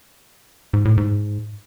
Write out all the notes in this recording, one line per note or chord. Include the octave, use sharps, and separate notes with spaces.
G#2
A2
G#2